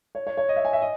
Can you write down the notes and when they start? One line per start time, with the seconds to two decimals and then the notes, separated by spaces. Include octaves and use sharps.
0.15 C#5
0.27 C#5
0.37 C#5
0.49 D#5
0.56 E5
0.65 G#5
0.73 E5
0.82 D#5